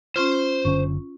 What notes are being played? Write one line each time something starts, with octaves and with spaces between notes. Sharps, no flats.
C#4 F4 C5 C6
F#1 D3 C#4 C#6